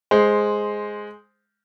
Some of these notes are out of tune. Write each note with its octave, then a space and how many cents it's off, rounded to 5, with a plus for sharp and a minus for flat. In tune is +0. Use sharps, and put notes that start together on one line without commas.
G#3 +0 C5 +0